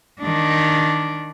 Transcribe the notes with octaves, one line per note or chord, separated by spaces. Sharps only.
D#3 D4